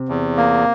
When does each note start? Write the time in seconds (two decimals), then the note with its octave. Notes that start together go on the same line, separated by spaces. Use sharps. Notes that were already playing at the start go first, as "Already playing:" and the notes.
Already playing: C3
0.09 E2
0.37 A#3